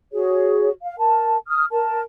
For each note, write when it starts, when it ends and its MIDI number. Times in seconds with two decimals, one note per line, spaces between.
0.12 0.70 66
0.12 0.70 68
0.12 0.70 73
0.82 0.95 77
0.99 1.36 70
0.99 1.36 81
1.48 1.65 87
1.48 1.65 89
1.71 2.00 70
1.71 2.00 81